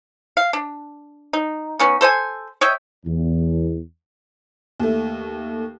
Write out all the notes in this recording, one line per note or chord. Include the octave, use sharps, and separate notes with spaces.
F5
D4
D#4
B3 C#4 D#4
A4 C5 C#5 G#5
C#5 D#5 E5 G5
E2
D#2 A3